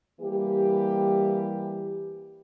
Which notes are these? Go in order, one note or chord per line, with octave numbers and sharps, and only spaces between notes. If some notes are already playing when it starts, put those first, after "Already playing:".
E3 G3 A#3 G4